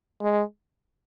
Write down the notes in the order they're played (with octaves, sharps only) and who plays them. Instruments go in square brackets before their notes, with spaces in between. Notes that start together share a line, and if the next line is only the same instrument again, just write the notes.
[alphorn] G#3